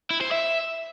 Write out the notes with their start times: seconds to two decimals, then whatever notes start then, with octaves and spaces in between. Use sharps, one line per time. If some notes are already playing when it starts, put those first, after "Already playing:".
0.10 E4
0.21 C5
0.32 E5